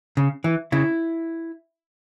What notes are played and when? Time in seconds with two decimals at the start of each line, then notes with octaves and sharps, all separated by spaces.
0.17 C#3
0.44 E3
0.72 C#3 E4